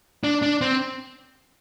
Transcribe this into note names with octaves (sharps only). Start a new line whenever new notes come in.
D4
D4
C4